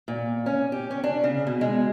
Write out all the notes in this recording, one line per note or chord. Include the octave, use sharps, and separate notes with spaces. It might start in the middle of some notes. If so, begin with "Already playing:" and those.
A#2
C#4
G4
C#4
D4
C#3
B2
G#3